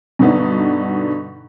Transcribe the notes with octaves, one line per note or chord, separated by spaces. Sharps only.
G2 B2 D3 B3 D4 D#4